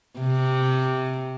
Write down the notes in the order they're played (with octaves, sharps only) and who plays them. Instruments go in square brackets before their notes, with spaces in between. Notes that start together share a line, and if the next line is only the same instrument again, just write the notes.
[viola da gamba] C3